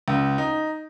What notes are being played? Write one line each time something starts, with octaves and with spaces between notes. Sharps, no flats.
C#2
D#4